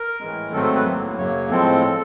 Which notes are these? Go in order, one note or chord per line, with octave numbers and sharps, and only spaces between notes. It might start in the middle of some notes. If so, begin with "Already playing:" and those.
Already playing: A#4
A2 E3 G#3
G#2 D#3 F#3 A3 C4 A4
A4
B4
A2 F#3 A#3
F#2 C#3 F#3 A#3 C#5
A2 F3 G#3 C4 A4